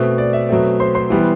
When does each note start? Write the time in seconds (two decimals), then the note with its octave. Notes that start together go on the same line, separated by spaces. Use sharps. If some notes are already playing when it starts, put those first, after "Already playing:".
Already playing: B2 A3 C4
0.18 D5
0.33 E5
0.49 B2 F#3 A3 C4
0.80 C5 C6
0.95 C5 C6
1.10 E3 G3 B3